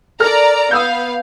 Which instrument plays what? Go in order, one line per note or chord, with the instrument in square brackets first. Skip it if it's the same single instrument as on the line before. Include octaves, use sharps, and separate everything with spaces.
[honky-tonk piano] A4 A#4 F6 [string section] D5 A#5
[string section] B3 F5 [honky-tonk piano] D#6 E6 G6